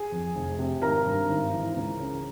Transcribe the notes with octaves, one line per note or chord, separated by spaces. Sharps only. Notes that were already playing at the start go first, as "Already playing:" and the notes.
Already playing: G#4
F2
F1
C3
G#1 A#4 A#5
G2
G#1
E3
C#2
C#3